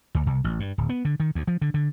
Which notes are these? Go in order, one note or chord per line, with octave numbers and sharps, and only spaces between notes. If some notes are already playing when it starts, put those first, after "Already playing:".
D2
C2
A1
G2
D1
B3
D3
D#3
D2
F3
D3
D3